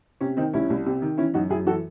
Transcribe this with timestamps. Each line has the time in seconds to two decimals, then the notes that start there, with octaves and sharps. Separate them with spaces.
0.21 C3 C#4
0.37 D#3 C4 D#4
0.53 C2 C#4 E4
0.70 C2
0.86 C3
1.02 D#3
1.18 E3 C#4 E4
1.34 F#2 D#4 F#4
1.50 F#2 E4 G#4
1.66 E3 F#4 A4